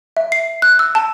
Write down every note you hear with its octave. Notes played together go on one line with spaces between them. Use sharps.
E5
C7
F#6
E6
A5